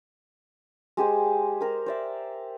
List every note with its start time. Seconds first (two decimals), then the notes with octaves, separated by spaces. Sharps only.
0.97 G#3 G4 G#4 C5
1.61 G4 A#4 C5
1.86 C5 D5 E5